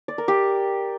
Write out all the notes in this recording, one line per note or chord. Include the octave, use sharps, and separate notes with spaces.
D5
A#4
G4